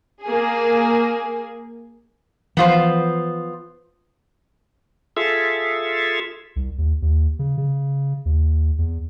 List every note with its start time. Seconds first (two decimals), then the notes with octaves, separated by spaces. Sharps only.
0.23 A#3 G#4
2.57 E3 F3 B3 F4 C5
5.17 F4 G#4 A4 E5
6.56 C2
6.78 D#2
7.02 D#2
7.39 C#3
7.58 C#3
8.25 D#2
8.78 E2